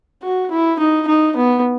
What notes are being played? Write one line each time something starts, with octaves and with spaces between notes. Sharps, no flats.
F#4
E4
D#4
D#4
B3